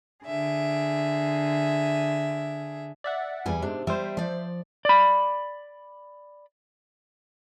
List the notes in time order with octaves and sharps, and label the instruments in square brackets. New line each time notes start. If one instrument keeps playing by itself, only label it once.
[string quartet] D3 G#4 E5
[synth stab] D5 E5 F#5
[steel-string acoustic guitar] E2 G3 G#5
[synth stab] G#2 C3 [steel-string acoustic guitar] D4
[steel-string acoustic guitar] G3 [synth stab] C5 E5
[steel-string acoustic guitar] F3 D5
[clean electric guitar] D5 B5